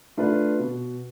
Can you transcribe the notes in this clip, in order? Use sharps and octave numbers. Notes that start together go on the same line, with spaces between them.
A3 D4 F4 B4
B2